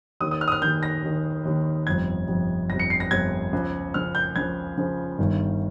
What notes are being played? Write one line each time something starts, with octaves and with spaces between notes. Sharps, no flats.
D#2 D#3 D#6
D#6
F6
D#6
F6
D#2 D#3 G6
A#6
D#2 D#3
D#2 D#3
G1 F2 C3 G#6
G1 F2 C3
G1 F2 C3 A#6
C#7
C7
A#6
G1 F2 C3 G#6
C#2 C#3 F3
C#2 C#3 F3 F6
G6
C#2 C#3 F3 G#6
C#2 C#3 F3
G1 G2 D#3